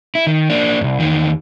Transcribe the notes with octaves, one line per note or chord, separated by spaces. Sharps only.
E4
D#3
A#3 D4
C2 F#2
E2 D#3